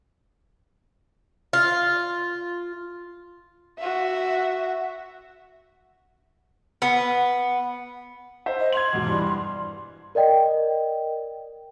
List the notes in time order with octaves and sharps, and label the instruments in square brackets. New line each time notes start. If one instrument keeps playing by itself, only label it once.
[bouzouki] F4
[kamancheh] F#4 E5
[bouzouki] B3
[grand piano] C5 E5
[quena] D#5
[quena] C6 [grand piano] G#6 F7 F#7
[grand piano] E2 G#2 B2
G2 E3 D4
[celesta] A#4 D5 D#5 G5